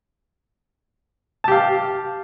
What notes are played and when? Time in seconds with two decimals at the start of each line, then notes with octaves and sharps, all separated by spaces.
1.44 A5
1.48 G4
1.52 F5